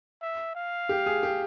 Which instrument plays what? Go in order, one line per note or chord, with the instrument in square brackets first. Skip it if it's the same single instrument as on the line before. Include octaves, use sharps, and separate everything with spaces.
[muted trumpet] E5
F5
[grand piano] G4
G#4
G4